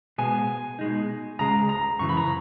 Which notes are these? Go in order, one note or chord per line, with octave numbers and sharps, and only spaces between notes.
B2 G#3 B3 G#5
B2 G#3 D#4
C#2 C#3 G#3 A#5
A#5
F#2 C#3 E3 C#6
B5
A#5